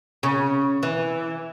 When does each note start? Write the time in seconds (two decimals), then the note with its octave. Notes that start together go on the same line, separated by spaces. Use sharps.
0.23 C#3
0.83 E3